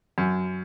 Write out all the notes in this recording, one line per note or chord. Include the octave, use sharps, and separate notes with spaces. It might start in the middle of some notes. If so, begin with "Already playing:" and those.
F#2